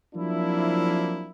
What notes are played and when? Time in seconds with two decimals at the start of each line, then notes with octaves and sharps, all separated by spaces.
0.15 F3 F#3 A#3 C4 D4 E4